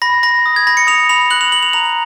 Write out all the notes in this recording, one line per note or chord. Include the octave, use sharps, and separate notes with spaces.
B5 A#6
B5 A#6
D#6
G#6
B5 A#6
C#7
D#6 F7
B5 F7
F#6 F#7
F7
B5 F#7
F7
A#5 F7